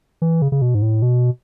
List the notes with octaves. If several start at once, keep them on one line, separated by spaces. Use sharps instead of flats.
E3
C#3
C#3
B2
G#2
A2
B2